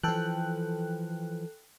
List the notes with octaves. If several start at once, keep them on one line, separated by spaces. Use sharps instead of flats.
E3 F3 A4 G5 F#6